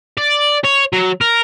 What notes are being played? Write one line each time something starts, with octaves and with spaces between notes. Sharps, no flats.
D5
C#5
F#3
A#4